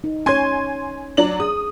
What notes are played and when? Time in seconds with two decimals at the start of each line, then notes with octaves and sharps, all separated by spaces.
0.04 D#4
0.26 C#4 C#5 G#5 C6 G#6
1.17 F#3 D4 F#7
1.40 G#4 D#6